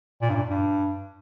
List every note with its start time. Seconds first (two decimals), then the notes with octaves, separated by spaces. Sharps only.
0.22 A#2
0.30 G2
0.35 A#2
0.50 G2